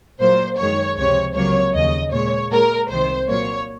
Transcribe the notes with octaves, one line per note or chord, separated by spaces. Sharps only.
A#2 F#3 A#3 C5
F#2 D#3 G#3 C#5
C#2 C3 F3 C#5
C#2 C3 F#3 A#3 C#5
D#2 C#3 F3 D#5
A#2 G#3 C#5
A#2 G#3 A#4
C2 C3 D#3 C5
A#2 F#3 A#3 C#5